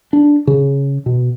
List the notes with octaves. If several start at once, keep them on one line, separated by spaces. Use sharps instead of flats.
D4
C#3
B2